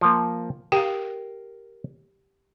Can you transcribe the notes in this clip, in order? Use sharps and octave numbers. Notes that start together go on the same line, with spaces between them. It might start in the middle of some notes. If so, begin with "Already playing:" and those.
F3 A#3
G4 A#4 F5 G5